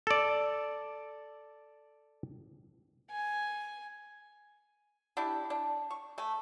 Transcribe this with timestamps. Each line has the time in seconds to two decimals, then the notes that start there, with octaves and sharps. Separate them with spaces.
0.07 A4 D5
3.10 G#5
5.17 D4 E4 G4
5.50 D4
5.91 C#6
6.18 A3 G#5